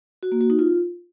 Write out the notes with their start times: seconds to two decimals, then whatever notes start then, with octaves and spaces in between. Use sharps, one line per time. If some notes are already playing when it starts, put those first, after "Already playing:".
0.23 F#4
0.32 A#3
0.41 F#4
0.50 D#4
0.59 F4